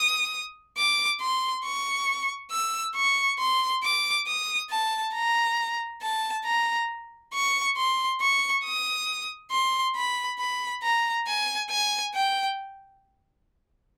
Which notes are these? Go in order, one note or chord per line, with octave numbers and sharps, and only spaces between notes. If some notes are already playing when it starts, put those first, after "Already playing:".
Already playing: D#6
D6
C6
C#6
E6
C#6
C6
D6
D#6
A5
A#5
A5
A#5
C#6
C6
C#6
D#6
C6
B5
B5
A#5
G#5
G#5
G5